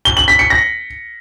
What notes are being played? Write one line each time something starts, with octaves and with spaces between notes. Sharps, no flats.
G7
F#7
B6
C#7
A#6